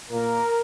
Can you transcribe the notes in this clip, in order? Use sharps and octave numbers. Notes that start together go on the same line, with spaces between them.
A#2 A#3 A#4